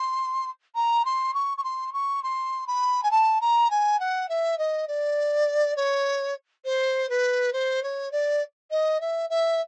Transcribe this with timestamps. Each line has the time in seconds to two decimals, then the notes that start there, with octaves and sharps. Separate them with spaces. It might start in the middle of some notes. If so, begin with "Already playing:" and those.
Already playing: C6
0.75 A#5
1.05 C6
1.34 C#6
1.58 C#6
1.64 C6
1.93 C#6
2.23 C6
2.67 B5
3.03 G#5
3.11 A5
3.41 A#5
3.70 G#5
4.00 F#5
4.29 E5
4.58 D#5
4.88 D5
5.76 C#5
6.65 C5
7.09 B4
7.53 C5
7.83 C#5
8.12 D5
8.71 D#5
9.00 E5
9.30 E5